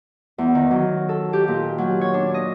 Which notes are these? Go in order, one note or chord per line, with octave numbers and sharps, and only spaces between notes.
E2
D#3
F#3
A4
G4
A#2
F#3
C#5
D4
D#5